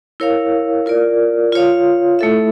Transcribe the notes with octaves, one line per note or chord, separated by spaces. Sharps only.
E4 A#4 C#5 F5
F4 A#4 D5
F4 C#5 F5
A3 E4 A4 E5